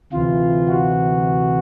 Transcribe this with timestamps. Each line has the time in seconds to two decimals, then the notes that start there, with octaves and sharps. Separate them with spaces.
0.13 D2 C3 E3 F4
0.68 F#4